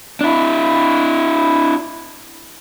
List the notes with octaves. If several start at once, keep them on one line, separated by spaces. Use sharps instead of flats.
D4 E4